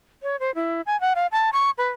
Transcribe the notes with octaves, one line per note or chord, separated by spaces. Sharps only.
C#5
C5
E4
G#5
F#5
F5
A5
C#6
B4